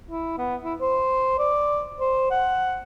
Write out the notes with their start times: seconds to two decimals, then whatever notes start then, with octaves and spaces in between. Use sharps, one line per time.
0.10 E4
0.38 B3
0.64 E4
0.81 C5
1.39 D5
2.00 C5
2.31 F#5